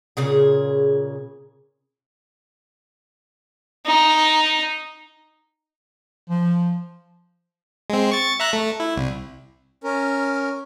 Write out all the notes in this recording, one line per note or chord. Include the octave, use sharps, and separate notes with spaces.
A#2 C#3 G#4
D#4
F3
G#3 C4
C#6 A6
E5 A#5 F#6
A3
E4
C2
C#4 A#4